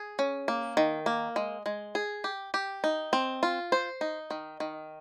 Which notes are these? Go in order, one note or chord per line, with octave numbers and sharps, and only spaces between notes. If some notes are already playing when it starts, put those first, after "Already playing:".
Already playing: G#4
C#4
A#3
D#3
A#3
G#3
G#3
G#4
G4
G4
D#4
C4
F4
C5
D#4
D#3
D#3